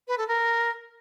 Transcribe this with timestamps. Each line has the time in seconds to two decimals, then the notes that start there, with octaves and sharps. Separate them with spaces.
0.08 B4
0.18 A4
0.28 A#4